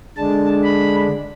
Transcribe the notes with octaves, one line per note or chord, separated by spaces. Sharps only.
D3 G#3 D4 A5
B5